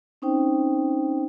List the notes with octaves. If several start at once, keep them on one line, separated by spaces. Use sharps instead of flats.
C4 C#4 D#4 C5 G5